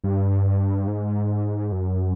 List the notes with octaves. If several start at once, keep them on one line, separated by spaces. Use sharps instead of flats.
G2
G#2
F#2